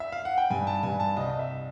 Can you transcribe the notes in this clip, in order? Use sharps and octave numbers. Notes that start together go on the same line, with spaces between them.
E5
F5
F#5
G5
G2 G#5
A5
G2 G#5
A5
C2 D#5
D#5
E5